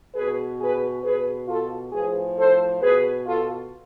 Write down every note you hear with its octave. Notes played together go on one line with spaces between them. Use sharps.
B2 G#4 B4
G#4 B4
B2 G#4 B4
F4 A4
A2 F3 G#4 B4
A4 C5
B2 G#4 B4
F4 A4